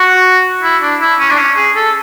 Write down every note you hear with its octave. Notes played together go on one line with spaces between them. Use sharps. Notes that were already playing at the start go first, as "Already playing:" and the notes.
Already playing: F#4
E4
D4
E4
C#4
D4
C#4
G#4
A4